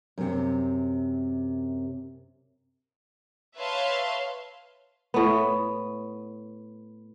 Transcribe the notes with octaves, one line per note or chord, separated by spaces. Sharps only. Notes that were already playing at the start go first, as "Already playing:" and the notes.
F#2 C3
B4 C#5 E5 F5 A5 C6
A2 B3